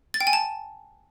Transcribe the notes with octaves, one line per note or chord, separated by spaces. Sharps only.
A6
G5
G#5
A5